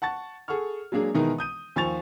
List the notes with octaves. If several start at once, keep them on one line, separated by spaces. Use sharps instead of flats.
F#5 A5 C#6 A6
G#4 A4 F#5 C#6 F6
F#3 G#3 A#3 D4 G#4
B2 D#3 E3 G#3 D#4 A#4
D#6 G6 D#7
D#2 F3 G#5 C#6 A6 F7